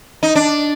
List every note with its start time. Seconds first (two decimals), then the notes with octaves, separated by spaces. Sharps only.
0.23 D#4
0.35 D4